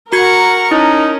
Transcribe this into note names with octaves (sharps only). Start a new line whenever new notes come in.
F#4 A#4 F#5 C#6 G#6
C#4 D#4 E4